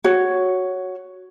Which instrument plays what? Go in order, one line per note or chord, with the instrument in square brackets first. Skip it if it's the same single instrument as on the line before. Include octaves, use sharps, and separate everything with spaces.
[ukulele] F#4 C#5